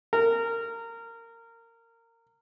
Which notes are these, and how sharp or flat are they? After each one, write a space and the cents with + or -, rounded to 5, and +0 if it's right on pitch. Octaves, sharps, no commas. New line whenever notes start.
A#4 -20